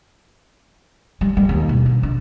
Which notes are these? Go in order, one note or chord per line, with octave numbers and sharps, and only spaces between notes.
G3
G3
D#2
B2
D3
D3